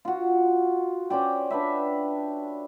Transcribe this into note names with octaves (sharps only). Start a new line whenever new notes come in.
F4 F#4
C#4 C5 D5 G5
D4 B4 E5